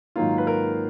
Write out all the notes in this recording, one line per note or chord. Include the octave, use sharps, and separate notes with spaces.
G#2 D#3 F#3 A#3 F4
B4
A#4